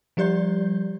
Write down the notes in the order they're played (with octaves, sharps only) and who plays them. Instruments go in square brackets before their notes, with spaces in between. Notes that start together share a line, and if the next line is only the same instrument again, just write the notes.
[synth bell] F3 G3 G4 D5 G6